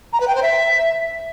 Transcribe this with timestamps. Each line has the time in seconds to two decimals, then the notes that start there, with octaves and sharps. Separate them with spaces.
0.13 A#5
0.20 B4
0.28 G5
0.35 C5
0.43 E5